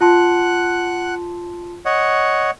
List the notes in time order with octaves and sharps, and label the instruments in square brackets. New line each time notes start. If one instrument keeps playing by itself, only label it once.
[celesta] F4 A5 C6 [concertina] F#5 F#6
[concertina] C#5 D#5 F#5